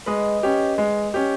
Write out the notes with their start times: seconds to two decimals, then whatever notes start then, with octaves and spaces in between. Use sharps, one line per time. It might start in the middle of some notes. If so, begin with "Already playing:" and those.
0.06 G#3 B4 D#5
0.43 C#4 G4
0.78 G#3
1.14 C#4 G4